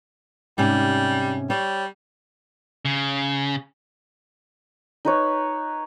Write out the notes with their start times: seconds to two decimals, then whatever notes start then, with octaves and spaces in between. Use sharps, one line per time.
0.58 G#2 C3 G3 C#4
1.50 G3 C#5
2.85 C#3
5.05 D#4 B4 C#5